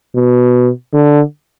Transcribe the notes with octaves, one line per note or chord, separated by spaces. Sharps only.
B2
D3